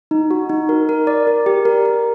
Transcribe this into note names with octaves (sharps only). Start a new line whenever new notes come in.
D#4
F#4
D#4
A#4
A#4
D5
A#4
G4
A#4
A#4